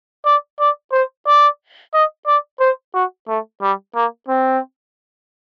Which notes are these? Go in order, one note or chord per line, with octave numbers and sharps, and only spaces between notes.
D5
D5
C5
D5
D#5
D5
C5
F#4
A3
G3
A#3
C4